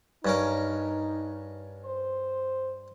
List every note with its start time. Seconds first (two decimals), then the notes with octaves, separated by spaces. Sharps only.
0.25 G2 C#4 D#4 A#4
1.85 C5